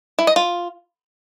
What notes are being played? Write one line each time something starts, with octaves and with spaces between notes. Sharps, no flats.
E4
D#5
F4